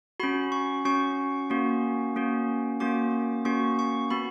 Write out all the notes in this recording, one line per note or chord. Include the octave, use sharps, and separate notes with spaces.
C#4 F#4 B5
C#6
C#4 F#4 C#6
A#3 C#4 F#4
A#3 C#4 F#4
A#3 C#4 F#4 D6
A#3 C#4 F#4 C#6
C#6
B3 F#4 B5